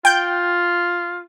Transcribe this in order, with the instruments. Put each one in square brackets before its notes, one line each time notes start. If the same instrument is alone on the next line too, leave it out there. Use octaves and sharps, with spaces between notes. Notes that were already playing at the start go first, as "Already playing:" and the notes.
[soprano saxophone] F4 [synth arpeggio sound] G5 G6